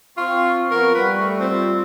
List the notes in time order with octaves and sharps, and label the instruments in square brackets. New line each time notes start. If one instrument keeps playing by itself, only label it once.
[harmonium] C4 [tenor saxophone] F4 [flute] C#6
[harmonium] F3 B3 [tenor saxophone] A#4 [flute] C#6
[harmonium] G3 [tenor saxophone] B4
[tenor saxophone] A3
[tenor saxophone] C4 [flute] F4